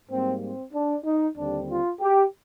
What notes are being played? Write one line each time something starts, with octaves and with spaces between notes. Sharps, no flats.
G#2 G3 A#3 C4
C4
D4
D#4
D#2 D3 G3 C4 D4
F4
G4